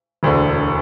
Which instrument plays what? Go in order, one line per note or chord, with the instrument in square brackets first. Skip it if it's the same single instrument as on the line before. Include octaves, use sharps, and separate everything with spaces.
[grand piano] E1 D2 D3